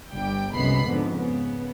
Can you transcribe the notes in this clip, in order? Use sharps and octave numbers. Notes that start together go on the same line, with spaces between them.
G1 G3 G5
C2 F#2 G#3 B3 B5 C7
F2 G#2 D3 B3
C#3 B3